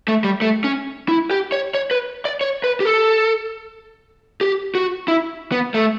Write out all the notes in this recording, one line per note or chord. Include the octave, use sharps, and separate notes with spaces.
A3
G3
A3
C#4
E4
G4
C#5
C#5
B4
D5
C#5
B4
G4
A4
G4
F#4
E4
B3
A3